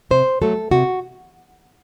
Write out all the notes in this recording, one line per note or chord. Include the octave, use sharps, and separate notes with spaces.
C3 C5
F#3 A3 A4
C3 F#4